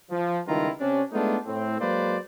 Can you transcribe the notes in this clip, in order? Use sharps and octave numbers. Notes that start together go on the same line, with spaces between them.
F3
C#2 G2 D#3 E4 F4 A#5
C3 C#4 D4
G#3 A3 B3 D4 D#4 F4
A2 C4
F#3 G#3 A#3 B4 C5 D5